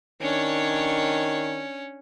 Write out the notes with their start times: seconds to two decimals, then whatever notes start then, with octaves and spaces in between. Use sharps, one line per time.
0.22 D#3 C#4 D4 C#5